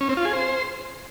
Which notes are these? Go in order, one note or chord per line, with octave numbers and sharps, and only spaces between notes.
C#4
C4
F4
G#4
C5